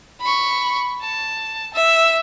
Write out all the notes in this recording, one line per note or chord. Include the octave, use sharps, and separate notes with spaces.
B5 C#6
A5
E5